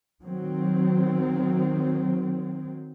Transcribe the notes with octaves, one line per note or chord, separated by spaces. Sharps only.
D#3 F#3 C4